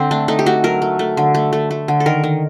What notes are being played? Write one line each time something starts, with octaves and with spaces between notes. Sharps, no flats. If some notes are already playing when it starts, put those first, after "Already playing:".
Already playing: D3 C4
A3 D4
A3 D#4
G4
A3 F#4
F#3 A#4
A3
A3
D3
A3
A3
A3
D3
A4
D#3 A#4
D#3